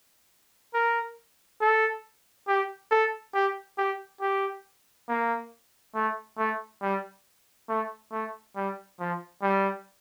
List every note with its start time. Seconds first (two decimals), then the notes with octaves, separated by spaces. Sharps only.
0.74 A#4
1.61 A4
2.48 G4
2.91 A4
3.34 G4
3.78 G4
4.21 G4
5.09 A#3
5.95 A3
6.38 A3
6.82 G3
7.69 A3
8.12 A3
8.56 G3
9.00 F3
9.42 G3